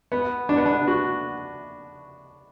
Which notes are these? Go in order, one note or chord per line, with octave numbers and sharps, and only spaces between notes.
B3
D4
B3
D4
F#4